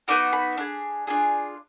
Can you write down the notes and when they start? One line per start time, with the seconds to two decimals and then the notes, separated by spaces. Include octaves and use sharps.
0.08 B3 D#4 F#4 D6
0.33 B5
0.58 D4 G#4
1.07 D4 F4 G#4